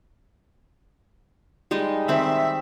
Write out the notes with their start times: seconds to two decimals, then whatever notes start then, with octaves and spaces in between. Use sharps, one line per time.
1.71 G3 G#3 D#4
2.08 D#3 C4 E5 B5